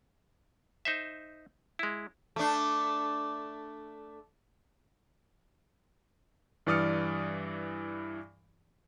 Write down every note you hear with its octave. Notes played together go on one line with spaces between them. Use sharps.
D#4 C5 E5
G#3 E4
A3 D4
G2 E3 D5 D#6 F6 C#7